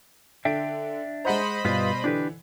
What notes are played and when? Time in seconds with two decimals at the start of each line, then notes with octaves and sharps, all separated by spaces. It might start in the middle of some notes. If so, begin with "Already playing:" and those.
0.45 D3 D4 E5 G5 D7
1.25 G#3 C5 D#5 F#5 A#5 B5
1.65 G2 B2 G3 F4 B4
2.04 D3 E3 D4 G4 B4